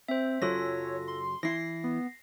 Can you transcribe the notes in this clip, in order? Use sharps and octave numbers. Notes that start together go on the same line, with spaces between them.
C4 C5 E5
F#2 C#3 F#3 F4 A4 C#5 A#6
C6
E3 E4 A#6 C7
B3